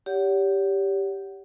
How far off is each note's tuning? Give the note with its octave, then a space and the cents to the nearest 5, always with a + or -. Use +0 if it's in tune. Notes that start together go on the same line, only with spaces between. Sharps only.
G4 +0 C#5 +40 F#5 +15